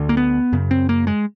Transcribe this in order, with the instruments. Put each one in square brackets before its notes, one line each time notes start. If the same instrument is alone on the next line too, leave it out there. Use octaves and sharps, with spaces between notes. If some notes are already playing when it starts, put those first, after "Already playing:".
Already playing: [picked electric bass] D2 D3
A#3
B3
F#2 C#3
C4
A#3
G#3